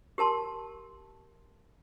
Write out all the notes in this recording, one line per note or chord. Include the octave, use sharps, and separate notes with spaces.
G4 A#4 A5 C6